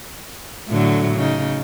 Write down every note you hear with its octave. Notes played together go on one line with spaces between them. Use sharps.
A2 D3 F#3
C#3 D#4